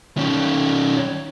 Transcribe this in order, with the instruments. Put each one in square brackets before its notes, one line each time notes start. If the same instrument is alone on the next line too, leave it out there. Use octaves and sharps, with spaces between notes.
[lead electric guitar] D#3 C#4